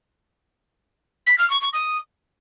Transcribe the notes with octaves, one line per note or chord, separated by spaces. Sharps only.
B6
F6
C#6
C#6
D#6